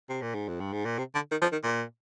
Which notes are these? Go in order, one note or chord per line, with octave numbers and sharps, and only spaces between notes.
C3
A#2
G#2
F2
G2
G#2
A#2
C3
D3
D#3
F3
D#3
A#2